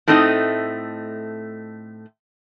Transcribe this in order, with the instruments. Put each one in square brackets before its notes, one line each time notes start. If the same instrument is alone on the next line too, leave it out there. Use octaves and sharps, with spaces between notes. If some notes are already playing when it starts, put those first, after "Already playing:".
[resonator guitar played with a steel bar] A2 A3 C4 D#4 C5 D#5